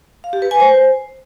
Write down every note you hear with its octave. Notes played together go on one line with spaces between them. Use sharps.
F5
G4
B4
G#5
C5